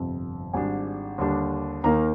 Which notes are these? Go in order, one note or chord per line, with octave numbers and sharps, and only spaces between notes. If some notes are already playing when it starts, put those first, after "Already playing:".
Already playing: G1 F2 C3
G#1 G#2 G3 D4 G#5
D#2 D3 G3 D4
D#2 D#3 A#3 A#5